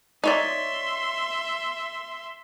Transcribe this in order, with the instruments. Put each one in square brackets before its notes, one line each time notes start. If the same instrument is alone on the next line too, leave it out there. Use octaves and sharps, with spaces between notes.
[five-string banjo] D#4 C#5 D5 [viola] E5 C6